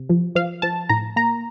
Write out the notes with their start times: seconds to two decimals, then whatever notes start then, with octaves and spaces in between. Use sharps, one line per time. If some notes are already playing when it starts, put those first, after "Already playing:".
Already playing: C3
0.09 F3
0.35 F3 F5
0.62 F3 A5
0.89 A2 A#5
1.16 A#3 A#5